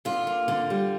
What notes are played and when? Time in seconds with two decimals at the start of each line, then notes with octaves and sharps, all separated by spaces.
0.05 D3 F4
0.27 A#3
0.48 D3
0.70 G3